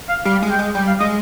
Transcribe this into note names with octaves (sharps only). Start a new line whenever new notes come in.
F5
G3 F5
G#3
G5
G#3
G3 G5
F5
G#3 D#5